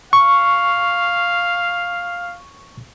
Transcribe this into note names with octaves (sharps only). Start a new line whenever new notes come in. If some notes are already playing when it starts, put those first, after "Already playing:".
F5 C#6